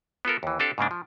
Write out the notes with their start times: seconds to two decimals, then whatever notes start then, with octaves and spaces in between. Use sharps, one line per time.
0.25 B3 F4 A4 A#4
0.43 D#2 E3
0.59 C4 D4 G4 A4 F5
0.78 G#2 C#3 A#3 D4
0.91 F3